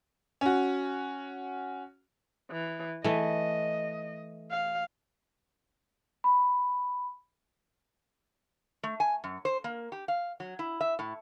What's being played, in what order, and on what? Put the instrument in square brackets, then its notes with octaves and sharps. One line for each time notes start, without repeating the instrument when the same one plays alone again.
[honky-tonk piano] C#4 F#4
[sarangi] E3
[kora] E3 A3 [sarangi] D#5
[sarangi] F5
[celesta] B5
[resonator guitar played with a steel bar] A3
G#5
F#2
C5
A#3
G4
F5
F#3
E4
E5
A2